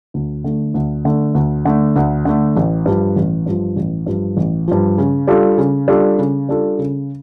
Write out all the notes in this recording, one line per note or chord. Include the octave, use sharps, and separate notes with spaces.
D2
D3 A3
D2
D3 A3
D2
D3 A3
D2
D3 A3
A1
G2 F3
A1
G2 F3
A1
G2 F3
A1
G2 F3
C#3
G3 D4 F4 A4
C#3
G3 D4 F4 A4
C#3
G3 D4 F4 A4
C#3